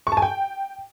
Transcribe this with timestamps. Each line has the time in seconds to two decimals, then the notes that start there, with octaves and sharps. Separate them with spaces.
0.07 C#6
0.12 A5
0.17 G#5
0.22 G5